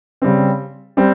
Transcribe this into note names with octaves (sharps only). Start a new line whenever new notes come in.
C#3 G3 C4
G3 C4